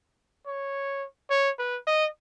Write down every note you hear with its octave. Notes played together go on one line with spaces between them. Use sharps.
C#5
C#5
B4
D#5